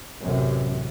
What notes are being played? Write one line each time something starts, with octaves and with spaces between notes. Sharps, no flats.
A1 F#2 C3